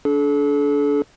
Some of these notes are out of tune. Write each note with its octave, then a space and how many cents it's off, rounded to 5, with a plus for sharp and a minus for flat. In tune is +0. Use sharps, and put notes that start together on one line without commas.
D4 -25 A4 -35